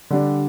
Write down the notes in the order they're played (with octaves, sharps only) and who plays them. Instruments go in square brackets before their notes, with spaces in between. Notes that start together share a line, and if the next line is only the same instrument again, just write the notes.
[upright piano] D3 G3 D4